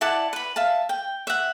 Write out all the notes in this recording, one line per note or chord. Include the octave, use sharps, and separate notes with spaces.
E4 D5 F#5 A5
B4 B5
E5 F5 A5
G5
E5 F#5